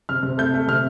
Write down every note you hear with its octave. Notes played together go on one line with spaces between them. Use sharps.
C3 F6
C3
A3 G6
A3
C3 F6